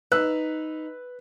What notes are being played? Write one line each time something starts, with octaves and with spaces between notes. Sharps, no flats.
D#4 B4 E6 F#6